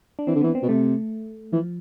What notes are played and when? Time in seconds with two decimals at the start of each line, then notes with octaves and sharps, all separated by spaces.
0.19 D4
0.27 E3 C4
0.35 D3
0.41 E3 B3
0.55 C4
0.62 B2
0.69 C3 A3
1.53 E3 F3